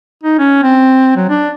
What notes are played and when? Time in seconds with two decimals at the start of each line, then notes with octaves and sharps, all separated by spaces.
0.23 D#4
0.38 C#4
0.63 C4
1.16 F#3
1.29 D4